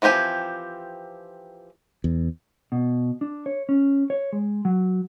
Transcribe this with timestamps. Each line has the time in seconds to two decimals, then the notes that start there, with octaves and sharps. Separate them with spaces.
0.02 E3 F3 C4 G4 G#5
2.04 E2
2.72 B2
3.21 D4
3.46 C#5
3.69 C#4
4.10 C#5
4.33 G#3
4.65 F#3